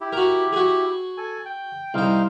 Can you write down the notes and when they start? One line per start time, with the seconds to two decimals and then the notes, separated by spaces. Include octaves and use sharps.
0.01 E4 G4
0.13 F#4 A#4
0.53 F#4 G#4
1.18 A4 G#5
1.46 G5
1.94 C2 D#4 C5 F5 G5